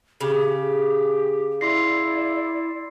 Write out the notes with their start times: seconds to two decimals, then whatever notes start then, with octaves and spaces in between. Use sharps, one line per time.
0.21 C#3 G4
1.61 E4 D5 C6 A#6 C7